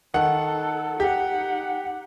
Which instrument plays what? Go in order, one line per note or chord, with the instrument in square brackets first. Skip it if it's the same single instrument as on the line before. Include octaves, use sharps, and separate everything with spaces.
[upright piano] D#3 F#5 [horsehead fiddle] A4
[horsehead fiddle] D#4 F#5 [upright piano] G4